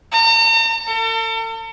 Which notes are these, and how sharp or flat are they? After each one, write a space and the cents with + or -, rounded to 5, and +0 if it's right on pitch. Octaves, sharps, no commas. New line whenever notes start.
A#5 -45
A4 +40